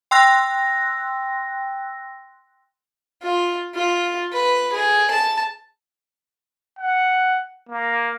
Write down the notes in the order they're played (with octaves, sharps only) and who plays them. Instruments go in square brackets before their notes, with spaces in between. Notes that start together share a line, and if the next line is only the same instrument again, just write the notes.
[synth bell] G5 C6 E6 F#6 A#6
[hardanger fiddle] F4
F4
B4
G#4
A5
[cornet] F#5
A#3